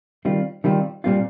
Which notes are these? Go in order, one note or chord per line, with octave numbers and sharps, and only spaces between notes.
D#3 G3 C4 F4
D#3 G3 C4 F4
A#2 G3 C4 F4